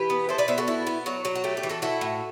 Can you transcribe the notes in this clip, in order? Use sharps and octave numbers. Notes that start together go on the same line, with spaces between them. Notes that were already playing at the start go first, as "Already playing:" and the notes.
Already playing: E3 G4 B4
B3
E4 A4 C5
B4 D5
B3 C5 E5
F#4 A4
E4
B3
F#3 F#4
F#3
F#4
A3 G4
G4
E3
F#4 A4
E4 F#4 A4
A2